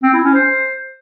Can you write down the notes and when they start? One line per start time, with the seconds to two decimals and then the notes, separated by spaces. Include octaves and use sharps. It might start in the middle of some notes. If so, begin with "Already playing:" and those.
0.03 C4
0.14 E4
0.24 C#4
0.35 C5